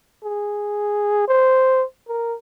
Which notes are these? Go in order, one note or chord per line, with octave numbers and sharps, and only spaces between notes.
G#4
C5
A#4